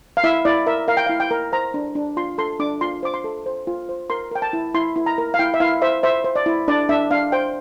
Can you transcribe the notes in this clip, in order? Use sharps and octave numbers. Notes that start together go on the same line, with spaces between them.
F5
E4 E5
E4 D5
A#4 E5
A#4 F5
G5
F5
E4
G5
A#4
C5 A#5
D4
D4
F4 C6
A4 C6
D4 D6
F4 C6
C5 D6
C6
A4
C5
F4
C5
A#4 C6
A#4 G5
A5
E4
E4 C6
E4
A#5
A#4
F5
E4 G5
E5
E4 F5
C5 E5
C5 E5
C5
D5
E4
D4 D5
D4 E5
D4 F5
C5 G5